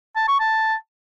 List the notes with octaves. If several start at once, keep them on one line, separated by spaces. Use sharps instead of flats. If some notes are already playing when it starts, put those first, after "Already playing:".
A5
C#6
A5